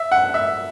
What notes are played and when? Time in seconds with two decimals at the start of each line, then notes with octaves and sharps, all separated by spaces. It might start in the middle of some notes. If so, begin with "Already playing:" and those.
Already playing: E5
0.12 F#5
0.34 E5